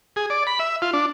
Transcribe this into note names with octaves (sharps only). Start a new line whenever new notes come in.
G#4
D5
B5
E5
F4
D4